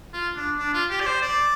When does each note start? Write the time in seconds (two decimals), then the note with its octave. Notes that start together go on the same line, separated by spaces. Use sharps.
0.13 F4
0.36 D4
0.57 D4
0.74 F4
0.90 G4
1.01 D5
1.06 C5
1.22 D5